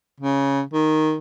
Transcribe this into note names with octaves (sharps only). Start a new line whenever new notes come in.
C#3
D#3